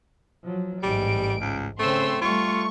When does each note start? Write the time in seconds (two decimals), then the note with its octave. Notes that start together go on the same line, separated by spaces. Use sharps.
0.43 F3 F#3
0.83 A1 G#2 G3 D7
1.41 C#2
1.79 C#3 A3 C4 C6 E6
2.21 G3 A3 F4 C#6